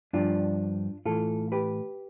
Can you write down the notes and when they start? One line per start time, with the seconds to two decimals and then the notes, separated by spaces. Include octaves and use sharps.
0.13 G2 F3 D4 F4
1.05 A2 E3 F4 A4
1.52 G4 B4